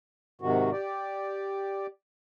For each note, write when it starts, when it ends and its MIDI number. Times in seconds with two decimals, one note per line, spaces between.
0.41 0.70 44
0.41 0.70 48
0.41 0.70 51
0.41 0.70 66
0.72 1.87 67
0.72 1.87 74